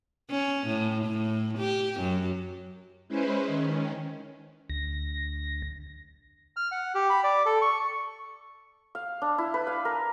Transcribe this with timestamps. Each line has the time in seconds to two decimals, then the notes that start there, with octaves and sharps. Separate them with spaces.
0.30 C#4
0.67 A2
1.05 A2
1.58 G4
2.00 F#2
3.08 G#3 C#4 E4 B4 C5
3.47 D#3 C#4
4.70 D2 A#6
6.57 F6
6.71 F#5
6.95 G4
7.10 B5
7.24 D5
7.46 A4
7.62 C#6
8.95 F5
9.22 D4
9.38 E4
9.54 B4
9.67 F5
9.85 A#4